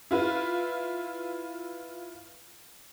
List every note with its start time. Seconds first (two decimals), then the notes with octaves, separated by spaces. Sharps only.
0.11 E4 F4 B4